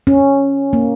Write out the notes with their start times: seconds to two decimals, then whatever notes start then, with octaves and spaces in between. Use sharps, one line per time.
0.07 C#4
0.73 A#3